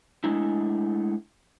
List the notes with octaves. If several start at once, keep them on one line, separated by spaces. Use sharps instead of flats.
G#3 A3 D4 E4